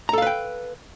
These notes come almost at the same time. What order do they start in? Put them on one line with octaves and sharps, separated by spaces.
A#5 A4 F5 B4 G5